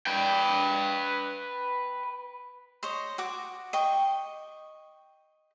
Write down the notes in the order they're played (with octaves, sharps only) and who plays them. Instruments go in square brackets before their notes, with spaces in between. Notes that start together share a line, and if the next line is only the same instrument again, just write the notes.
[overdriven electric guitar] B4 G5
[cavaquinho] C5 C#5 D#5
F#4 D6
D#5 G5 C#6